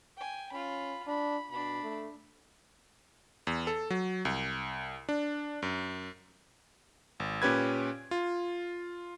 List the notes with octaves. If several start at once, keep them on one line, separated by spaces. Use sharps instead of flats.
G5 G#5
C#4 F4 B5
D4 B5
B2 D4 B5
A3
E2
A4
F#3
C2
D4
F#2
G#1
A#2 C#4 G4 B4 G#6
F4